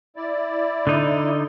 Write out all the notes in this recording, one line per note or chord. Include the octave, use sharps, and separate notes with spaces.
E4 D5
D3 D#4